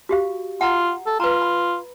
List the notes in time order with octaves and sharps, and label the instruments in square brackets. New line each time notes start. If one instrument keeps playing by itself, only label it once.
[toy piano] F#4 G4 F5
[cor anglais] F4 [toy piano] F#5 A#5
[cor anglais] A4
[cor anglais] F4 [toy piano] B4 A#5
[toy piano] B5